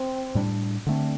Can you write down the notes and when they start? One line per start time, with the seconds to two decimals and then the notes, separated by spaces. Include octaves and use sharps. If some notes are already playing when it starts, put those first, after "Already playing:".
Already playing: C4
0.35 A2 G3 D4
0.86 D3 A3 C4 D4